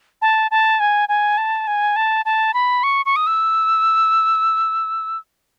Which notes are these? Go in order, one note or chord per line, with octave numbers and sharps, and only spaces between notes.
A5
A5
G#5
G#5
A5
G#5
A5
A5
B5
C#6
C#6
D#6
E6